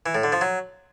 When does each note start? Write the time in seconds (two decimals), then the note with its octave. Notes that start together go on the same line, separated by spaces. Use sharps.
0.06 E3
0.15 A2
0.24 D3
0.32 F3
0.41 F#3